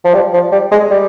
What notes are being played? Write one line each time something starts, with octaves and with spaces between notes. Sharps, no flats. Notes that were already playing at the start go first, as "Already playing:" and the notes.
F3
G3
F3
G3
G#3
G3